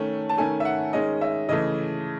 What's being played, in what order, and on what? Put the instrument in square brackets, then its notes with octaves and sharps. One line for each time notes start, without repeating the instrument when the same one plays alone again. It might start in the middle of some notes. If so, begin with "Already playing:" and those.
Already playing: [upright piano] D#3 A3 C#4
A5
D#3 A3 C#4 G#5
E5
F#5
D#3 G#3 C#4 D#5
E5
C#3 E3 A3 D#5